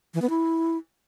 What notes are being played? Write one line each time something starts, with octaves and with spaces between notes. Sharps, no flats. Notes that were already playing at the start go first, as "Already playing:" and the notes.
E3
B3
E4